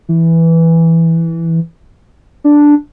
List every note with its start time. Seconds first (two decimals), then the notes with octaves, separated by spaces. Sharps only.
0.09 E3
2.44 D4